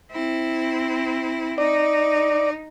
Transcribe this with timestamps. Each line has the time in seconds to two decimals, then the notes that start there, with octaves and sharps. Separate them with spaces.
0.12 C4 E4
1.58 D#4 D5